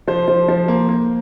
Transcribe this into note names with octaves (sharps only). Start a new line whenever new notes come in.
F3 C5
F3
F3
A#3
A#3